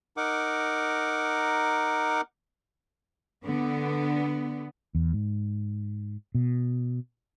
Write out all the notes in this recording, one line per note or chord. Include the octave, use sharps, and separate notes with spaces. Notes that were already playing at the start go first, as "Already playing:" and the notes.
D#4 A#4 F#5 D6
D3 B3
E2
G#2
B2